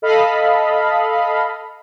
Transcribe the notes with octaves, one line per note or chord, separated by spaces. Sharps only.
A4 D#5 F5 B5